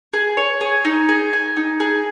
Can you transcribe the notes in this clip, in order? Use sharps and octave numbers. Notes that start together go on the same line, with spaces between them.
G#4
C#5
G#4
D#4
G#4
G#5
D#4
G#4